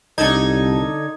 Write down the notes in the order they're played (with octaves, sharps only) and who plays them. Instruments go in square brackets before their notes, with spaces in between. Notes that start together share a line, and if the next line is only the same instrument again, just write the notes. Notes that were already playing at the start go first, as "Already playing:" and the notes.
[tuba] C2 [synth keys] D3 A4 G#6 [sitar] D#4